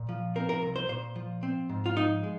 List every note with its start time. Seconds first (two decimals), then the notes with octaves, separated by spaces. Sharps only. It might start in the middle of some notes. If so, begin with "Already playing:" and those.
Already playing: A#2
0.09 F3
0.35 C4 A#4
0.49 A#4
0.62 C2
0.76 C5
0.89 A#2 C5
1.16 F3
1.43 C4
1.69 G#2
1.86 F4
1.96 F3 D#4
2.23 G#3